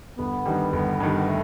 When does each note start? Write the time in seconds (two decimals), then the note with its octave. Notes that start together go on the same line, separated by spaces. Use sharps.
0.18 G1 B3
0.45 G2 D#3 G3
0.73 G1
1.00 G2 D#3 G3
1.16 B3
1.28 A3